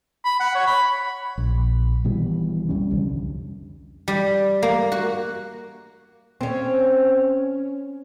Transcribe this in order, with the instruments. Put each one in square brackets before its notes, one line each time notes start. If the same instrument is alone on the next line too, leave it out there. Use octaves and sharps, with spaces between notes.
[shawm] B5
F#5
C#5
B5
[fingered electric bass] A#1
G#1 B2 E3 G3
F2 G3 C#4
C2 F2 D3
[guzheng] G3
A#3
F#4
[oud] C4 C#4